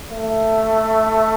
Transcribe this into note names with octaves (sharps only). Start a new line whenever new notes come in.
A3